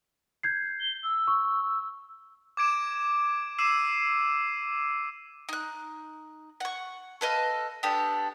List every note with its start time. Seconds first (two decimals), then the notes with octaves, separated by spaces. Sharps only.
0.43 G6 G#6 C7
0.80 G7
1.03 E6
1.28 C#6
2.57 D6 G#6 D7 E7
3.58 D6 E6 C7 D#7 E7
5.49 D#4 F#6
6.60 F#5 C#6
7.21 A4 B4 D#5 F5
7.83 B3 D4 G4 A4